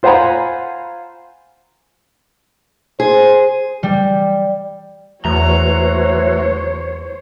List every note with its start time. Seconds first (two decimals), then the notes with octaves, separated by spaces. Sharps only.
0.03 F4 C5 F#5 G#5 A#5 B5
3.00 G#4 C5
3.83 G3
5.25 E2 E3 A3 F#4 C5 C#5 A#5